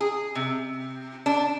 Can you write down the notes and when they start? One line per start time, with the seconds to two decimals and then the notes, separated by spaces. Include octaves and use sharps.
0.01 G#4
0.35 C3
1.26 D4